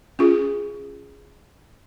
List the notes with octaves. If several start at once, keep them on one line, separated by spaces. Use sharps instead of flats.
C#4 F4 G#4